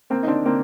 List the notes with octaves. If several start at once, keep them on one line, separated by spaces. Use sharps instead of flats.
A#3 C4
D#4
C4 D4
A#3 C4